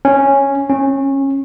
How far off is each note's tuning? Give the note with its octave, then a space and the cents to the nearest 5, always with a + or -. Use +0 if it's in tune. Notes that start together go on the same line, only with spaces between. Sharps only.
C#4 -5
C#4 -20